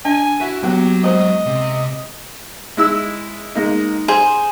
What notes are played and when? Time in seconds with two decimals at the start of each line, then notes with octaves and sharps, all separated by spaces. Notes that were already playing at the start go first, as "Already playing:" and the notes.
0.05 D4 G#5
0.41 E4 F#4 E5
0.63 F#3 A#3 B3 G4
1.04 G#3 C5 D#5
1.46 C3
2.77 G#3 E4 E6
3.55 G#3 A#3 D#4
4.08 G#4 C5